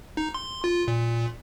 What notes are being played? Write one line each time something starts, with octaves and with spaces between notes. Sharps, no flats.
D#4
C6
F4
A#2